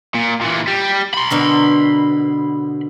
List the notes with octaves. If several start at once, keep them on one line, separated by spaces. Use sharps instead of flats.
A#2
A#2 E3
G3
B5 C6
B2 D3 A#4